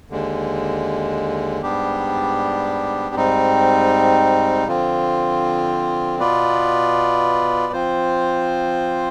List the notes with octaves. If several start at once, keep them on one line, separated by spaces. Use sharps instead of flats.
D#2 D3 G#3
G#2 G3 B3 D4 G4
G#2 G3 C4 D#4
D3 F3 C4 F4
B2 B3 F4 B4 D5
F3 C4 F4 C5